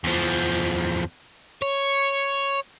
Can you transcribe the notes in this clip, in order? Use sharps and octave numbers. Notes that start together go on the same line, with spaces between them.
E2 F3
C#5